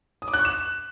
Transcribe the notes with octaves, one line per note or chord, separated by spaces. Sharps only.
D#6
D6
F#6
C#6
E7